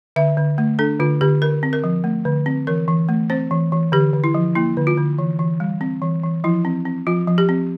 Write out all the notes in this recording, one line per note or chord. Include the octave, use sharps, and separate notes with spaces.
D3 E5
D3
A3
D4 A4
D3 F4
D3 G4
D3 A#4
C4
A#4
F3
A3
D3
C4
E3 A#4
E3
A3
C4 C5
E3
E3
D3 G4
D3
E4
F3
A#3 E4
D3
F4
D3
E3
E3
G3
C4
E3
E3
F3 E4
C4
C4
F3 F4
F3
G4
C4